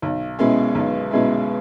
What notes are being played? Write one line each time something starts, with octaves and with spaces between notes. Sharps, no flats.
B1
B2 G#3 C#4 E4
B1
B2 G#3 C#4 E4